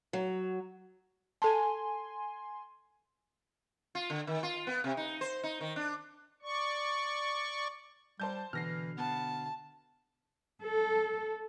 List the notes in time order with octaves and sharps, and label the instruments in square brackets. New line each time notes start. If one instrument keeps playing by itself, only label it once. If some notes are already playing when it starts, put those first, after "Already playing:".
[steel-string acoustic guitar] F#3
[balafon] A4 A5 [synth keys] G#5 C6
[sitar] F4
D3
D#3
F4
B3
C3
D#4
C5
D#4
D#3
D4
[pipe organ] D5 C#6
[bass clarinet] G3 [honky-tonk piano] C5 A5 G6
[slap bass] B2 D3 [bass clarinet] E3 [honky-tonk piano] F6 A#6 C7
[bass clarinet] B3 [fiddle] A5
[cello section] A4